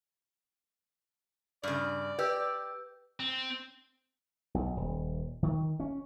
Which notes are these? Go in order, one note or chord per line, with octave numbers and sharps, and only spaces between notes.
G2 C#3 D5
G4 B4 E6 G6
C4
B1
D#1
D#3
C#4